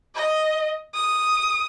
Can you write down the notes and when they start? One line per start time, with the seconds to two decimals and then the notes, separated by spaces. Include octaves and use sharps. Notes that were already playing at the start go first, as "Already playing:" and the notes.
0.15 D#5
0.94 D#6